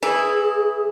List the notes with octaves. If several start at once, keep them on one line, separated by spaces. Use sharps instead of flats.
E3 E4 G#4